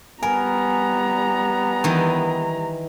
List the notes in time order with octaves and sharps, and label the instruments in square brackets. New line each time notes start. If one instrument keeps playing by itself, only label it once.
[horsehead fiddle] G3 A#5 [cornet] B3 [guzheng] A#4 [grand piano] G#5
[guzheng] D#3 E3